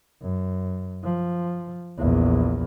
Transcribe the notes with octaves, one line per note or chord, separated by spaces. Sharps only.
F#2
F3
A#1 E2